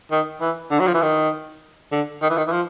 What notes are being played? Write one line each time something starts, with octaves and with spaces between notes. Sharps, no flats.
D#3
E3
D3
F#3
F3
E3
D#3
D3
D#3
E3
D#3
E3
F3